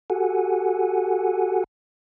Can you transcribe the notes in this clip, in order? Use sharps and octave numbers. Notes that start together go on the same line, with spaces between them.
F#4 G4 A4 F#5 G#5